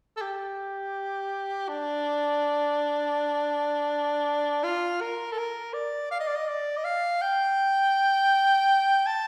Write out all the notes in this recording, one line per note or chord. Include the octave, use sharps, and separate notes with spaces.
A4
G4
D4
F4
A#4
A4
A#4
D5
F5
D#5
D5
D#5
D5
D#5
F5
G5
A5